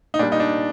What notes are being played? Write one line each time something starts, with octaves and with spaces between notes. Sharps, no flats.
D#4
A#2 G3 D4
D#4
D4